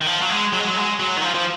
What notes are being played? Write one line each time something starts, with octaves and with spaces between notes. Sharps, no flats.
D#3
F3
F#3
G#3
F#3
G#3
F#3
G#3
F#3
D#3
F3
F3